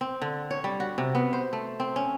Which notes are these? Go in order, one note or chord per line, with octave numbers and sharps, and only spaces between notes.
C4
D3
C#5
G3
F#4
C3
B3
C5
A3
C4
C#4